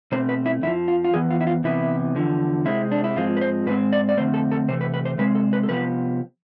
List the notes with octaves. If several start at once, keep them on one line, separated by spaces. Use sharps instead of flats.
B2 A3 C4 C5
B4
E4
F2 D3 F3 E4
F4
F4
F2 E3 B3 G#4
F4
E4
F4
C3 E3 B3 E4
E2 D3 F3
C3 G#3 C4 E4
D4
E4
G#2 F3 G#3 C4 F4
B4
C5
G#2 G#3 C4 B4
D5
D5
F2 D3 A3 C4 C5
A4
A4
C3 E3 A3 C5
B4
B4
C5
C3 G#3 C4 B4
A4
B4
A4
C3 F3 B3 B4